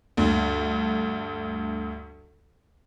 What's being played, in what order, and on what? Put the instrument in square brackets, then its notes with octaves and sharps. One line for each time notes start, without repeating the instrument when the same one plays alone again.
[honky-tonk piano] D2 G2